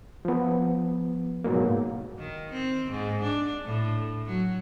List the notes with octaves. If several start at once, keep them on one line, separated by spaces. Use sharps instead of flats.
F3 B3
G#2 B2 F#3 A#3
D#3
C4
G#2
D4
A2
F#3